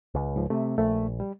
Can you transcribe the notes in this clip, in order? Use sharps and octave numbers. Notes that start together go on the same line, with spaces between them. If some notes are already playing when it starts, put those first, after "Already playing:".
C#2
G#2 F3
C3 A3
A#1 A3
G3